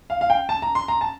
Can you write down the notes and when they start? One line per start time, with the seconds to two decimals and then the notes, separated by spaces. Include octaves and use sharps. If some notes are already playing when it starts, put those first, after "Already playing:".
0.10 F5
0.21 F5
0.30 G5
0.49 A5
0.62 A#5
0.75 C6
0.88 A#5
1.01 A5